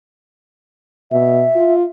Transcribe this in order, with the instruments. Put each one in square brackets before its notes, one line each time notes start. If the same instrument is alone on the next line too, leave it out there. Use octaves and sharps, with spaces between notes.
[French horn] B2 [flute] E5
[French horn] F4